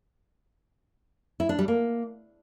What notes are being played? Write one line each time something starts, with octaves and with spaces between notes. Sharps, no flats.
E4
D4
G3
A#3